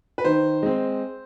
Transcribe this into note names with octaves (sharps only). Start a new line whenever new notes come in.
B4
D#3 C5
G#3 C4